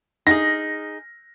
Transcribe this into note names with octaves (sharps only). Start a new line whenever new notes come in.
D#4 G#4 A#6